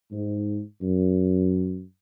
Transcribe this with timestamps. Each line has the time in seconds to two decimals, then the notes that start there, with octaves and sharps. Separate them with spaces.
0.11 G#2
0.81 F#2